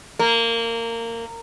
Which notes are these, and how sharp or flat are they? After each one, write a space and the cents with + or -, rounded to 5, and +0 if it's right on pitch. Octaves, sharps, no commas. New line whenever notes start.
A#3 -20